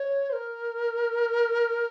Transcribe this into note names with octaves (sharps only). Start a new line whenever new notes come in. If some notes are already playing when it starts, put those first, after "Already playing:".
Already playing: C#5
C5
A#4